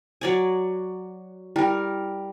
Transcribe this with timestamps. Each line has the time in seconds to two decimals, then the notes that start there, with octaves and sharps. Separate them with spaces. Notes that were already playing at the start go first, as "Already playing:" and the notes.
0.21 F#3 D5 G#5
1.56 G3 E4 A#4 G5